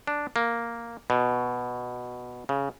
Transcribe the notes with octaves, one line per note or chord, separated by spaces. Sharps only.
D4
A#3
B2
C#3